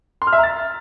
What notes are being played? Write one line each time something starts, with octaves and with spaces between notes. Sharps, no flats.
C6
F6
E5
A#5
A6